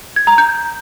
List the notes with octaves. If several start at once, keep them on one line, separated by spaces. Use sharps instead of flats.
G#6
A#5
G6